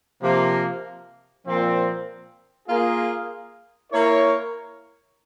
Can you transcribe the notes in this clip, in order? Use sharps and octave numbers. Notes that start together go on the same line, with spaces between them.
C3 F3 A#3
A#2 F3 C4
A#3 F4 G#4
A#3 E4 A#4 C#5